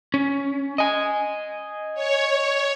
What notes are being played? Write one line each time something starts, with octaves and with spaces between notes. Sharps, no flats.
C#4
D#5 G#5
C#5